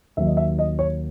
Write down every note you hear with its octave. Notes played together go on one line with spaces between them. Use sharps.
D#2 D#3 F#3 A#3 E5
D#5
E5
D#5
C#5